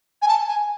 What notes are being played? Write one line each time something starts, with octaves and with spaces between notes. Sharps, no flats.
G#5
A5
G#5